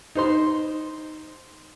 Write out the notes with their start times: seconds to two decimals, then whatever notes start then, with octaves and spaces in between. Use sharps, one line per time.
0.15 D#4 C5 C6